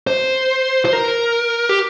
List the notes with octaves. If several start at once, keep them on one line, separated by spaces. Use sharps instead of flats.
C5
C5
A#4
G4